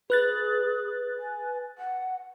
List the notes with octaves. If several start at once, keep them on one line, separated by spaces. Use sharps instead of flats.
G#4 B4 F#6 A6
G#5
F#5